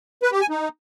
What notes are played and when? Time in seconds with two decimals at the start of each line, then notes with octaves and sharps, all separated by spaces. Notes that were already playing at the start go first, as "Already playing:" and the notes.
0.23 B4
0.32 G4
0.41 G#5
0.50 D#4